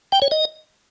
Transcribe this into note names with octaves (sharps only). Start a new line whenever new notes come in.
G5
C#5
D#5